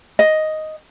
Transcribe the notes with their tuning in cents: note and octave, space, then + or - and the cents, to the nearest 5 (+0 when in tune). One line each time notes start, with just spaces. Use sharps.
D#5 +5